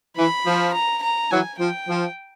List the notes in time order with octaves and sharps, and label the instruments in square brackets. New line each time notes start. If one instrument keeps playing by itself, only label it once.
[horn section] E3 [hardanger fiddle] B5
[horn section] F3
[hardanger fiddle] A#5
A#5
[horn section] E3 F#3 [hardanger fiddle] G#5
[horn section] F3 [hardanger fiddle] G5
[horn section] F3